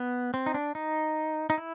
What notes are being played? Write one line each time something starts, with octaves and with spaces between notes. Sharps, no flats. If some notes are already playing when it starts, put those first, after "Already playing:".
Already playing: B3
C4
D#4
D4
D#4
D#4
E4